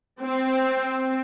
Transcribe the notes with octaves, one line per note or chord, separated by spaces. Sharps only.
C4